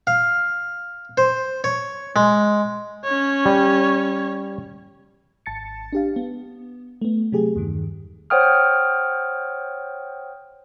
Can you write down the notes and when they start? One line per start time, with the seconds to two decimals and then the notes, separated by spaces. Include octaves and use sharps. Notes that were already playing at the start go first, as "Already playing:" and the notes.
0.07 F5
1.18 C5
1.64 C#5
2.16 G#3
3.05 C#4 C#5
3.46 G3
5.46 G#1 A5 A6 C#7
5.93 D4 G4 F5
6.16 B3
7.01 A3 B3
7.32 C3 F#3 A3 G4 G#4
7.56 E2 G2 D#3
8.30 C5 C#5 F#5 G5 D#6 F6